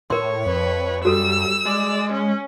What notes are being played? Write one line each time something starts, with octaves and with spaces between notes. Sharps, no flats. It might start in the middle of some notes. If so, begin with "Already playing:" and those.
A2 A#4 C#5 C6
F2 B4
F#2 G3 F#4 A4 E6
G#3 D5
C#4